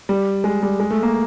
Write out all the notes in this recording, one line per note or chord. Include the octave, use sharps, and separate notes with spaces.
G3
G#3
G3
G#3
A3
A#3